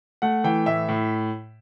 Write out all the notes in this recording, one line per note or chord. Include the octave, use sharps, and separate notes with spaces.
A3 F#5
E3 G5
A2 E5
A2